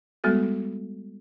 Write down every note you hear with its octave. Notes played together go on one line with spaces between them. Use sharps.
G3 G#3 B3 F#4 A4